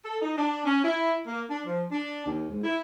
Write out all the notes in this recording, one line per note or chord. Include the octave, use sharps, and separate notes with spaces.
A4
D#4
D4
C#4
E4
A#3
D4
F3
D4
D#2
G#2
E4